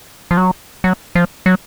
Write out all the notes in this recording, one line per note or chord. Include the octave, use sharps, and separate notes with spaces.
F3
F#3
F#3
F3
F#3